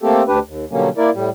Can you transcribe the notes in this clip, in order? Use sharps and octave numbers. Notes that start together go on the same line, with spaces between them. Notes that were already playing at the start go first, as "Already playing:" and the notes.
A3 A#3 C4 G4 A4
D2 D4 G4 B4
D#2
B2 D3 F#3 G3 A#3 C#4
A#3 E4 A#4 D5
A2 G3